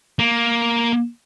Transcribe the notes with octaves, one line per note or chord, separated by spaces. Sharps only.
A#3